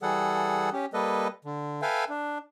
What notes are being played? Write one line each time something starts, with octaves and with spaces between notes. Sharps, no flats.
E3 G3 G#4 A4 F#5
C#4 G4
G3 A#3 A4 B4 D#5
D3
A4 B4 E5 F5 G5 G#5
D4